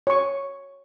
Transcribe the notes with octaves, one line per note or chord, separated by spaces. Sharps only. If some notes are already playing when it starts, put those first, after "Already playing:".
C#5 C#6